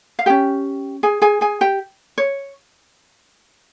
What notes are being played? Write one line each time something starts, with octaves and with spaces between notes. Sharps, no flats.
F5
C#4 G4 G#4 G5
G#4 G#5
G#4 G#5
G#4 G#5
G4 G5
C#5